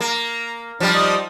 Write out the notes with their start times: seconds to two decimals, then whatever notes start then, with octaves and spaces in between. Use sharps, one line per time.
0.01 A#3 A#5
0.80 F3 G3 D4
0.93 D#4 D5 D#5